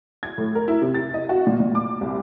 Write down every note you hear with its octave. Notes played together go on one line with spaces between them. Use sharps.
G#6
A2
A#4
E4
C3
A6
D#5
F#4
A#2
A#2
D6
C2